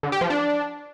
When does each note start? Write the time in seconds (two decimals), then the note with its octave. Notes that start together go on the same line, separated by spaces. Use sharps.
0.03 D3
0.12 G4
0.21 F3
0.30 D4